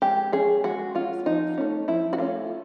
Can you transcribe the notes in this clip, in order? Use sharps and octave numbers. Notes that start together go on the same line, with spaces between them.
G#3 G4
C#4 G#4
G#3 F#4
C#4 F4
F3 D#4
A3 C#4
F3 E4
F#4
A3 C#4 F4